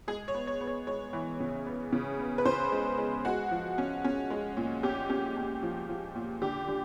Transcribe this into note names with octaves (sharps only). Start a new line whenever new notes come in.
G#3 G#4
C#5
B3
C#5
B3
C#5
G#3 C#5
E3
C#3
B3
C#3
B3
B4
C#3 C5
G#3
G#3
G#3 F#4
F3
C#4
C#4
G#3
A#2
C#4 G4
C#4
C#4
F3
F3
A#2
D3 G4
D3